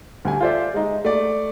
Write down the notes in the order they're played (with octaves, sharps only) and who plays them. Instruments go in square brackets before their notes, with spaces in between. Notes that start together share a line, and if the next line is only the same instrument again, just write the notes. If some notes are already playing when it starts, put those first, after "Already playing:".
[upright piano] D2 G3 G#5
F4 A4 C5 D5 E5
G#3 D#4
A3 D5